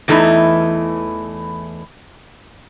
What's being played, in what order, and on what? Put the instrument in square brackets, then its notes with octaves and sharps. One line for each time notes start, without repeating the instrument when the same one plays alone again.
[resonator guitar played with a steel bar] E2 E3 A3 D#4